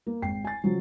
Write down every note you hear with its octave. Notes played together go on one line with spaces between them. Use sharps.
A#3
G#1 G5 C7
G#5 A6
C#3 F3 F#3